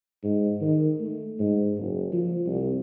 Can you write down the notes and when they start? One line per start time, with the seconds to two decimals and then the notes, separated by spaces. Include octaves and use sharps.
0.23 G#2
0.61 D#3
1.00 A3
1.39 G#2
1.78 F#1
2.12 F3
2.46 C2